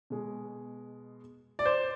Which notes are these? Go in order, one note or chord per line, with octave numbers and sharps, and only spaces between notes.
B2 G#3
D5
C5